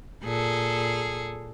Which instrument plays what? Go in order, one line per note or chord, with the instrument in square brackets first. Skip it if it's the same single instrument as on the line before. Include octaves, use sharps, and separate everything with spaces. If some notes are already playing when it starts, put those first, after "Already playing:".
[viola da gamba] A#2 G#4 A4